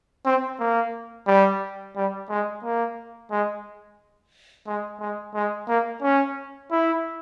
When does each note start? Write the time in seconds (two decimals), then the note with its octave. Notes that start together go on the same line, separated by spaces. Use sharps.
0.26 C4
0.60 A#3
1.27 G3
1.96 G3
2.30 G#3
2.64 A#3
3.31 G#3
4.67 G#3
5.00 G#3
5.35 G#3
5.69 A#3
6.02 C#4
6.71 E4